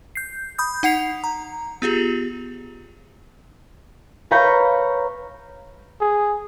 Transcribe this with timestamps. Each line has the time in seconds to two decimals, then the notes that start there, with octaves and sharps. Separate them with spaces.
0.15 G6 C7
0.58 B5 D#6 G6
0.83 D#4 F#5 C7 F7
1.24 A#5
1.82 B3 F4 G4 G#4
4.31 B4 C#5 F5 A#5 G6 B6
6.01 G#4